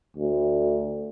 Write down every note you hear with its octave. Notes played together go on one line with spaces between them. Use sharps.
D2